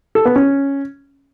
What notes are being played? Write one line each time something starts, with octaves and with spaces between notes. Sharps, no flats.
A4
B3
C#4